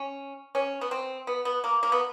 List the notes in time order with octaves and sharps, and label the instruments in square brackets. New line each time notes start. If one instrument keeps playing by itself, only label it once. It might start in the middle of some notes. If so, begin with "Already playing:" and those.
Already playing: [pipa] C#4
C#4
B3
C4
B3
B3
A#3
A#3
B3